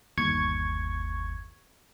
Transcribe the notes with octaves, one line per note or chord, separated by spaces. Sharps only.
G1 D#2 C#6 G#6